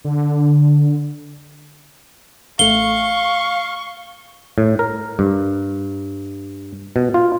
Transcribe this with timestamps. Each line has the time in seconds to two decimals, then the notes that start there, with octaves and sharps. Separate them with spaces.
0.05 D3
2.59 A1 A3 F5 C#6 G7
4.58 A2
4.79 A#4
5.19 G2
6.96 B2
7.14 F4